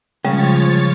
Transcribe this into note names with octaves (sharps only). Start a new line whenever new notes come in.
C#3 F3 G3 G#3 C#5 C#6 A6